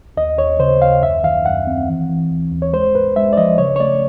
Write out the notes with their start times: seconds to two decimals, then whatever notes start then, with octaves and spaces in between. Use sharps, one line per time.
0.17 D#2 D#5
0.38 D#2 C#5
0.59 C#3 C5
0.82 D#2 F5
1.02 F#2 E5
1.23 D#3 F5
1.45 F#2 F#5
1.67 C4
1.88 E3
2.10 E3
2.30 D#2
2.52 D#2
2.62 C#5
2.73 G#3 C5
2.94 G#2 B4
3.16 G#3 E5
3.33 D5
3.37 F3 D#5
3.58 C#3 C#5
3.76 C#5
3.80 A3 D5